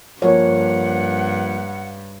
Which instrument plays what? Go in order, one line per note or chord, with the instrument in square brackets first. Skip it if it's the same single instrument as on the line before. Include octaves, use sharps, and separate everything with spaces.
[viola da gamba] G2 [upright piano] F3 A#3 [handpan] C#5 [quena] F#5